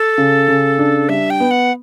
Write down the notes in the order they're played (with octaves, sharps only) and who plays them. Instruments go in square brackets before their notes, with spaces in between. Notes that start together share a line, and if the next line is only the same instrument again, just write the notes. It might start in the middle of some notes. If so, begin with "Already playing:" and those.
Already playing: [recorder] A4
[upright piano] C#3
C#3
D4
[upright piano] G3 [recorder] E5
[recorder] G5
[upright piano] B3
[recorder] F#5